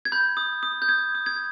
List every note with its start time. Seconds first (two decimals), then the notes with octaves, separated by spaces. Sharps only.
0.05 G#6
0.12 B5 G6
0.37 D#6
0.63 D#6
0.82 G6
0.89 D#6 G#6
1.15 D#6
1.26 G#6